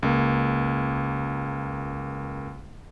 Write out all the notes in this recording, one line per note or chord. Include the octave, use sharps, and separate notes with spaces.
C#2 A#3